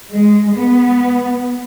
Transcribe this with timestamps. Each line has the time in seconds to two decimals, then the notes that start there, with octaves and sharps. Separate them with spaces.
0.13 G#3
0.56 B3